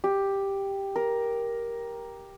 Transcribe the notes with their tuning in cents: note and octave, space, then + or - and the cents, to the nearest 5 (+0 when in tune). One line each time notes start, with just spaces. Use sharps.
G4 +5
A#4 +10